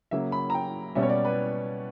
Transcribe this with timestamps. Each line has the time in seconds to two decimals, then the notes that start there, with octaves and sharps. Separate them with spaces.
0.11 C#3 F#3 A#3 E5
0.32 B5
0.50 A#5
0.54 G5
0.95 B2 G3 C#4 E5
1.03 C#5
1.09 D5
1.25 B4